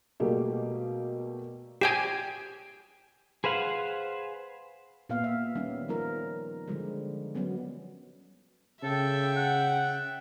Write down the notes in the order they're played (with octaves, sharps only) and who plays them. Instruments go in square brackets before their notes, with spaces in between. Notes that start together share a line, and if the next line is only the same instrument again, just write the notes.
[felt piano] B2 G3 A3 A#3 G4 G#4
[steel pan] G4 G5 G#5
[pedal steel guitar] G#4 B4 C5 F5 F#5
[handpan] A#2 B3 F5
E5
D#3 G3 B3 C#4
F3 G3 D#4 F4 A#4
D3 F3 G3 G#3
F#3 G3 B3 C#4
[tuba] C#3 [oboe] A4 [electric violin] E5 G5
[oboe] F#5